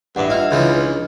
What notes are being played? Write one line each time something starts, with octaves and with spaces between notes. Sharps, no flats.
A1 G2 E5 F#5
D4 F4 D#5 F6
C#2 C#3 E3 F3